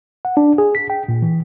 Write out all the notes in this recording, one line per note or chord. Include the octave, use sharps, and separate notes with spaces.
F#5
D4
G#4
B6
G5
A#2
E3